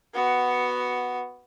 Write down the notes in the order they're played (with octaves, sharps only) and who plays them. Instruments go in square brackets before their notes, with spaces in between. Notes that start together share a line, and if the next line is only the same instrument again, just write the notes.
[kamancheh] B3 F#4